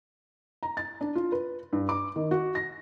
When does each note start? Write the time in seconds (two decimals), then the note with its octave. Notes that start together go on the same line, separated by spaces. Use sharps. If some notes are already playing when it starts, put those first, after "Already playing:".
0.63 A#5
0.77 A6
1.01 D4
1.15 F4
1.32 B4
1.73 G2
1.89 D6
2.16 D#3
2.31 F#4
2.55 A#6